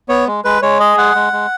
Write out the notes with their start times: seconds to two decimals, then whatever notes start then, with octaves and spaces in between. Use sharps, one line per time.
0.09 B3 C#5
0.27 G#3
0.44 G#3 B4
0.62 G#3 C#5
0.80 G#4 D#5
0.97 G#3 F#5
1.15 G#3
1.33 G#3